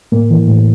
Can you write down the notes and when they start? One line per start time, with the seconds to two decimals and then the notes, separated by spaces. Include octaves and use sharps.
0.12 A2 A#3
0.30 E3
0.47 A2